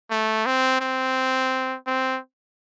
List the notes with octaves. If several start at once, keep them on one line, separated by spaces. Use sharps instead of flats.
A3
C4
C4
C4